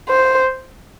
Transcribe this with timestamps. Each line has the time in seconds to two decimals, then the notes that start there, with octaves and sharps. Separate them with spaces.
0.09 C5